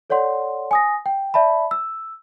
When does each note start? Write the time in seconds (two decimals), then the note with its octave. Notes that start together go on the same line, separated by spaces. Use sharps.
0.10 A4 C#5 D5 F#5 C6
0.71 G#5 D#6 A#6
1.06 G5
1.34 D5 E5 A5 B5
1.71 E6